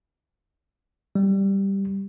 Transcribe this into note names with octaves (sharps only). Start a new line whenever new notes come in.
G3